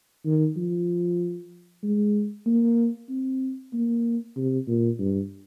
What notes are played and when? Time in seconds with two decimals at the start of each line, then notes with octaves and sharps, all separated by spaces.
0.25 D#3
0.57 F3
1.83 G#3
2.46 A#3
3.09 C4
3.74 A#3
4.37 C3
4.68 A#2
4.99 G2